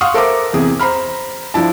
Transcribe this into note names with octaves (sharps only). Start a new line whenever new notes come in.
F5 F#5 C6 C#6 D#6 F6
A4 A#4 C5 E5 D6
E2 C3 G#4
C5 A#5 B5 F6
F3 D4 E4 A5